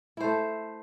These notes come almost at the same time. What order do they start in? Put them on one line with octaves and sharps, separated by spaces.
E4 C5 A3